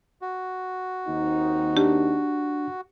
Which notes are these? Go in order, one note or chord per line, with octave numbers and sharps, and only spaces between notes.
F#4
D#2 C4 D#4
D4 G4